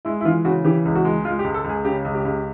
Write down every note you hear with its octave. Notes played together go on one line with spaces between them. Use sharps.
G#3 E4
E4
E3 F4
C#3 F#4
E3 G4
C#2
F#4
G#3
G#3 F4
G4
C#2
A4
C#2
G#4
C#3 G4
C#2
G4
C#2